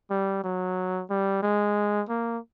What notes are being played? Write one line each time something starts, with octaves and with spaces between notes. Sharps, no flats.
G3
F#3
G3
G#3
A#3